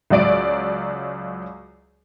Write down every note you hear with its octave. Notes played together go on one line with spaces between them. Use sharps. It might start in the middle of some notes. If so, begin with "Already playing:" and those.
C#2 F#3 D5 D7